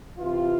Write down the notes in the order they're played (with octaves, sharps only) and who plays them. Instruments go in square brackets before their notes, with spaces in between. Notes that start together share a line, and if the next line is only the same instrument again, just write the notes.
[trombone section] C3 E3 F4